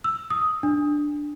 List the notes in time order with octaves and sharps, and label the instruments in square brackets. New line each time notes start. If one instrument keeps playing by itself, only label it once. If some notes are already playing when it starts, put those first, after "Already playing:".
[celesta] E6
D#6
D4